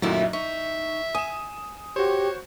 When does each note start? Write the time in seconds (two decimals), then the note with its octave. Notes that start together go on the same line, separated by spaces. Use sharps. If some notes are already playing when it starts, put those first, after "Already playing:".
0.02 F#2 A#2 D#3 F#3 A3 D#4 E4
0.33 D#4 E5 C#6
1.15 G#5 D#6 E7
1.96 F#4 G4 C5 C#5